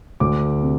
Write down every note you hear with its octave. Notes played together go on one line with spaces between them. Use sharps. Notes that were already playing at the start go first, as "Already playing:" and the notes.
D2 D6
C3